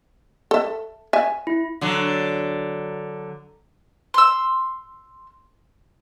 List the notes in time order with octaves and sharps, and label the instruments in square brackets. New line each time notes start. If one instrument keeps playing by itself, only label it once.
[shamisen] A4 E5
E5 G#5
[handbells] E4
[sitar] D3 F#3
[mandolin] C6 E6